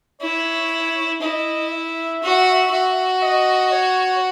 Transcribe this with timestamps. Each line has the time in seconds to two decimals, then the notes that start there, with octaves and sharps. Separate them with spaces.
0.21 E4 C#5
1.22 E4 D#5
1.73 E5
2.23 F#4
2.72 F#4
3.22 D#5
3.72 C#5